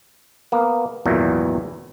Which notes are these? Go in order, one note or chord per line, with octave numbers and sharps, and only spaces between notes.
A#3 B3
G#1 E2 A#2 E3 F#3